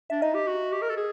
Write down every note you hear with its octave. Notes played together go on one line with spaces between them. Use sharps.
D4 E5
D#4 D#5
G4
F#4
G4
A#4
A4
G#4